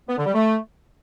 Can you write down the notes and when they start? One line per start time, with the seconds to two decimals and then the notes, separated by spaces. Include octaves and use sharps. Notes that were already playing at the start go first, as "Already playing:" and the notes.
0.09 B3
0.17 D3
0.26 G3
0.35 A3